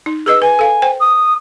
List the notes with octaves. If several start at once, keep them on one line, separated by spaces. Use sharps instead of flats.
D#4
G#4 B4 D#5 E6
B4 G#5
A4 F5
C5 G5
D#6